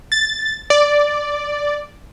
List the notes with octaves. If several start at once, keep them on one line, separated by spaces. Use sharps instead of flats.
A6
D5